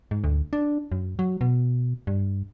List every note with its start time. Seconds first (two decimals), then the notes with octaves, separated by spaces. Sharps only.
0.11 G#2
0.24 D2
0.53 D4
0.92 F#2
1.19 F#3
1.41 B2
2.07 G2